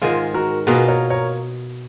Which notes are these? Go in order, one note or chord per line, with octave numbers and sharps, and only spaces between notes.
G#2 D#3 G#3 F4 G#4
F#4 A#4
B2 A#3 F4 G#4 B4
A#4 C#5
A#4 C#5